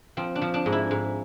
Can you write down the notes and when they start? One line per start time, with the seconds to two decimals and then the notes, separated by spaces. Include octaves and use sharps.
0.17 F3 C4
0.35 D4
0.42 F3
0.54 D4
0.66 G#2
0.72 E4
0.91 G#2